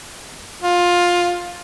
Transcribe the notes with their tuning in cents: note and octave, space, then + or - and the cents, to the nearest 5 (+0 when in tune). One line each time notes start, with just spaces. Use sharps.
F4 +15